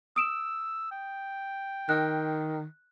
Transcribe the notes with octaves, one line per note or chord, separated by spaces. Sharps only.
D#6 E6 D7 E7
G5
D#3 F#6